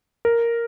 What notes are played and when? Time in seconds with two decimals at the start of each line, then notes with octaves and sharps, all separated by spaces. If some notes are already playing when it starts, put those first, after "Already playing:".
0.25 A#4